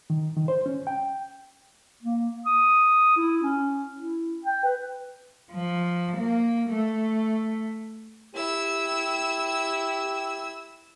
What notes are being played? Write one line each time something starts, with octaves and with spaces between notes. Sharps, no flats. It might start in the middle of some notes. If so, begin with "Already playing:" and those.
D#3
D#3
C5
C#4
G5
A#3
D#6
E4
C#4
E4
G5
B4
F3
A#3
A3
E4 G4 E6